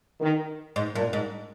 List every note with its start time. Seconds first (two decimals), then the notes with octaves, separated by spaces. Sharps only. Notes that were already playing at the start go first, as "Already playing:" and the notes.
0.20 D#3
0.76 G#2
0.94 G2 A#2
1.13 G#2